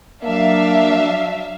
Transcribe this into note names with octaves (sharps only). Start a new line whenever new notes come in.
F#3 A#3 D4 E5 F5